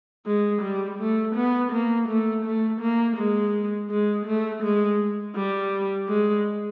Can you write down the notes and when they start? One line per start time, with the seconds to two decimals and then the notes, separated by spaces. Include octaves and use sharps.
0.26 G#3
0.62 G3
0.99 A3
1.35 B3
1.73 A#3
2.08 A3
2.45 A3
2.81 A#3
3.17 G#3
3.90 G#3
4.26 A3
4.63 G#3
5.36 G3
6.08 G#3